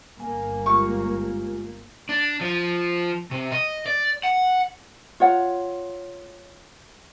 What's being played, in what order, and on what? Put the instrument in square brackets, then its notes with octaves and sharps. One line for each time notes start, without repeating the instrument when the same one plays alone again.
[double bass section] G1 A#3 [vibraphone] G#5
[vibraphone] G#3 F4 G4 [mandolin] C#6
[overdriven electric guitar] D4
F3
C3
D#5
D5
F#5
[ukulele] F4 C#5 F#5